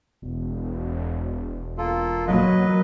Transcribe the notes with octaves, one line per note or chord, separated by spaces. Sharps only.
E1
A#3 F4 A4
F#3 A#3 B4 D#5